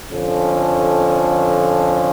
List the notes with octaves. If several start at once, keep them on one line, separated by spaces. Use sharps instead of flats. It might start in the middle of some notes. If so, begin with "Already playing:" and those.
F2 D3 F3 C#4